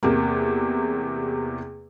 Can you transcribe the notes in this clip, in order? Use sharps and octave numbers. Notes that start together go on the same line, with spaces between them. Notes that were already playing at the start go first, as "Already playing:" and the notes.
E2 C3 A#3